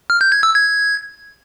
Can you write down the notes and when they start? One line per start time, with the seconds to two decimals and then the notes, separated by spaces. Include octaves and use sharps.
0.10 F6
0.21 G6
0.32 G#6
0.43 E6
0.54 G#6